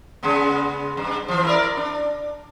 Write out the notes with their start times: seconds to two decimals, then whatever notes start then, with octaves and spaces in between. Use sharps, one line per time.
0.23 C#3 G#3 B3
0.97 G2
1.28 E3 F3
1.44 E4 A#4 D5
1.77 D4